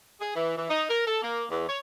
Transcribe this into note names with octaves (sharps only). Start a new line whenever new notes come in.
G#4
E3
E3
D#4
A#4
A4
A#3
E2
C#5